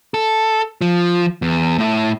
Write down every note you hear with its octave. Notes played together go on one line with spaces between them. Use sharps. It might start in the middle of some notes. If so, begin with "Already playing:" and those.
A4
F3
E2
A2 E4